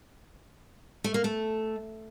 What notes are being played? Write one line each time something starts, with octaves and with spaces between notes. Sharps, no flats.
A3
A#3
A3